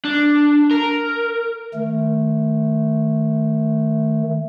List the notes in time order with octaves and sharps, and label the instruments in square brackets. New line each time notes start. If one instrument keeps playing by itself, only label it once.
[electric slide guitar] D4
A#4
[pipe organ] D#3 A3